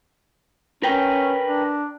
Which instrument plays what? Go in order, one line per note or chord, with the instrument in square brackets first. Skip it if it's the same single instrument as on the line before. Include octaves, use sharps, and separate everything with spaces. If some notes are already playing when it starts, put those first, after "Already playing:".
[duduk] C#4 [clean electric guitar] A#4 B4 G5
[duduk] D4